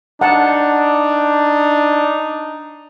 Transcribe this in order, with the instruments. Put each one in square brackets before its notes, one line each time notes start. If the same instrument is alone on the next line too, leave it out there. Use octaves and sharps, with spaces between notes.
[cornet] D4 [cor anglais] D#4 [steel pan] F#5 A5